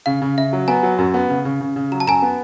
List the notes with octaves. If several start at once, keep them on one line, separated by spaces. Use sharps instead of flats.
C#3 F5
C#3
C#3 E5
F#3
B3 G#5 A#5
F#3
F#2
B3
C#3
C#3
C#3
C#3
F#3 A#5
A5
F#2 G#5 A#5
B3